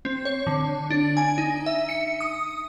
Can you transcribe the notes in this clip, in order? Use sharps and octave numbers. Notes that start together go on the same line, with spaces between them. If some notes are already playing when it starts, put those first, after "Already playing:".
C4
C#5
D3
D4
G#5
D#4
E5
C#7
D#6